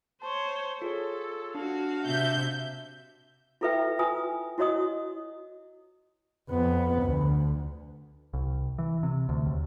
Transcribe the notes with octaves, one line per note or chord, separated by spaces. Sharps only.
C5 C#5 A5 C6 C#6
F4 G#4 A4 C#5
D4 F#4 F5
C3 E5 G6
E4 F4 A4 B4 E5 G5
F4 B4 G#5 D#6
E4 F#4 C#5 D#5 D#6
F2 B3
D2
C2
E3
C3
D2
D#2